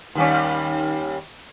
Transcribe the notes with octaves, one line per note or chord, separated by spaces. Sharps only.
D#2 G3 C#4